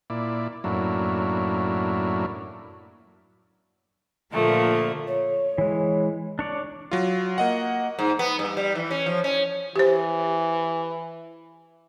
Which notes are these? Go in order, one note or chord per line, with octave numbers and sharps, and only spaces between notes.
A#2 E4 D5
F#2 A2 F#3 A#3 D4 E4
A#2 D3 F3 A3 A#3
C#5
E3 G#3
D4 C#5 D5
F#3 F4
A#3 D#5 F#5
G#2
B3
G2
G3
E3
C#4
F3
C#4
E3 G4 C5